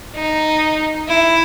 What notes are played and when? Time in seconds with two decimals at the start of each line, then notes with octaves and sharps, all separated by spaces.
0.15 D#4
1.08 E4